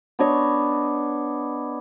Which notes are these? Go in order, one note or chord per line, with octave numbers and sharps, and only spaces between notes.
B3 D4 C#5 D#5